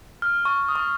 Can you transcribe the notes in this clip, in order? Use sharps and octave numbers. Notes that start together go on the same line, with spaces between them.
F6
C#6
D#6
C#6